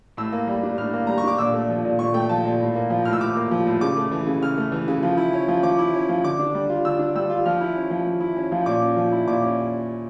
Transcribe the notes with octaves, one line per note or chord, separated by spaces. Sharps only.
A2 E6
A#3
G3
D4
A2 F6
A#3
G3 A#5
C#6
D4 D6
A#2 E6
A3
F3
A#2
A#2 C#6
A3 G5
F3 A5
A#2
A2
A#3
F3
A2 F6
E6
A2 D6
A#3
F3
A2
C#3 D6
A3
E3
C#3
C#3 F6
A3
E3
C#3
F3
E4
C#4
F3
F3 D6
E4
C#4
F3
D3 D6
D4
G3
F4
D3 E6
D4
G3 E6
F4
F3 F6
E4
C#4
F3
F3
E4
C#4
F3
A#2 D6
C#4
F3
E4
A#2 D6
C#4